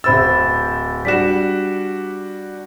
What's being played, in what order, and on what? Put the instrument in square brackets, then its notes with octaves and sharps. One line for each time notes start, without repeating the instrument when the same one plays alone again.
[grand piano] D1 C5 E6 [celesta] E5 B5 A6
[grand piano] G3 D4 F#4 [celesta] B6 E7